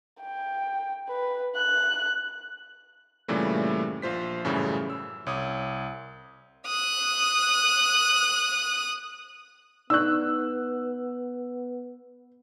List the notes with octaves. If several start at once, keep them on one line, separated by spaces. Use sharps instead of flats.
G5
B4
F#6
G2 A#2 C#3 E3 G3 A3
A#1 F4 C5 B6
F#2 A2 C#3 E3 G3
E6
C2 C#5 D6 D#6
D#6 F#6
B3 D#4 D5 C#6 E6 F#6